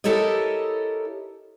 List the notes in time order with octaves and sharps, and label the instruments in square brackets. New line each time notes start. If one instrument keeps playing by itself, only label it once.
[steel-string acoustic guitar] E4 G4 A4 A#4 C#5 D#5